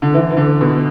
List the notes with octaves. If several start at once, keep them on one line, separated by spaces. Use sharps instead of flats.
D3
E3
E3
D3
B2